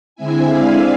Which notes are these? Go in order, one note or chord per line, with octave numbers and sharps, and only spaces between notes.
D3 G#3 C4 E4 E5 G#5
D5 F5